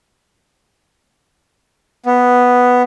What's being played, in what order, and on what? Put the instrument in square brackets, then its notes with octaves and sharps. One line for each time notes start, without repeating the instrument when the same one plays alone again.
[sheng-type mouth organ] B3